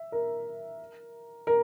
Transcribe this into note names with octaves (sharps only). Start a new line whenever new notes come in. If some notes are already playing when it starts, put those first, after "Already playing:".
Already playing: E5
A#4
A#4